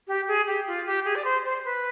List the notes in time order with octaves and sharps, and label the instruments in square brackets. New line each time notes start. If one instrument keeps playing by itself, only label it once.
[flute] G4
G#4
G4
F4
G4
G#4
D5
C5
C5
B4